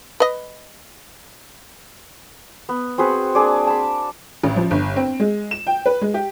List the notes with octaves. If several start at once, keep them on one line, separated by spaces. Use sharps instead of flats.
B4 D#5
B3
C4 F#4 G#4 B4
A#3 D4 G#4 D5
A5 B5
A1
F3
G1
C4
G#3
E7
G5
B4
G#3
G4